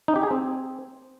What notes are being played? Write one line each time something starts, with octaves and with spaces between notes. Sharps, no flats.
D#4
G4
G#4
C4